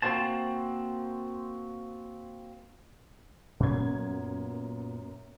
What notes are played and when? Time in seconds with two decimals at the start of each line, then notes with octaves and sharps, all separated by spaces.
0.02 A#3 C4 D#4 F#4 C5 A5
3.60 F#2 A#2 B3 G#6